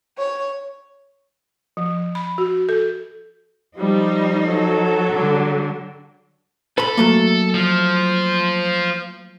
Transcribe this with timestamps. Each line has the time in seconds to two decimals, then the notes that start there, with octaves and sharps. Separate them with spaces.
0.18 C#5
1.77 F3
2.15 B5
2.38 F#4
2.69 A4
3.77 F3 G3 D#4
4.48 F#3 A4
5.12 D3 G3
6.78 A4 B4 B5
6.98 F#3 A3 A#3
7.54 F3